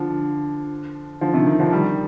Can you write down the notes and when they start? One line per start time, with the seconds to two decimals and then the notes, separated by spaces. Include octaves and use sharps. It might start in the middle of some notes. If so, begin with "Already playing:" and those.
Already playing: D3 F3
1.21 D3 F3
1.34 C3 D#3
1.46 C3 D#3
1.60 D3 F3
1.72 D#3 G3